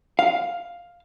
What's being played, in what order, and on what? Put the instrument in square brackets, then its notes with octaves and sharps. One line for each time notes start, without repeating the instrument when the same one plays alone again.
[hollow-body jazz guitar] F5